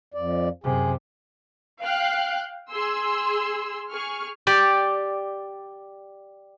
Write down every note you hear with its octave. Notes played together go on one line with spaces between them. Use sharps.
F2 D5
F#2 C3 G#4
F5 G5 F#6
G#4 C6 E6
G#4 C#6 F6
G4 D5